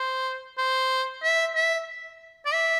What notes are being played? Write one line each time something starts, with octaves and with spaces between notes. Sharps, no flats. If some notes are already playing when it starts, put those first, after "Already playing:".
Already playing: C5
C5
E5
E5
D5
E5